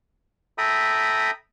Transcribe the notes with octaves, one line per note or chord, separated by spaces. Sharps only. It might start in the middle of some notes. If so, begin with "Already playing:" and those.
A4 E5 G5 A#5 B5 D#6